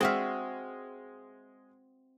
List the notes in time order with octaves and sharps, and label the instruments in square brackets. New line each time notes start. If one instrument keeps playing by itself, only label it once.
[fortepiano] G#3 F6 [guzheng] C4 F#4 E5